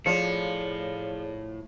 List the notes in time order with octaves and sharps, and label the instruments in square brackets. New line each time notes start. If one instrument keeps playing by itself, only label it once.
[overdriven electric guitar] A2 [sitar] F3 [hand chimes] G#4 C#5 D5 [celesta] C#7